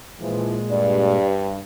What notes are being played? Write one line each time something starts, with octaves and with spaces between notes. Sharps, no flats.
A#2 E3 F3 G#3
G2 D5